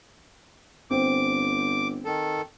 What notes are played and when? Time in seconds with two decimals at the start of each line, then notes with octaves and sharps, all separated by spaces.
0.91 G1 C4 D6
2.05 D#3 A4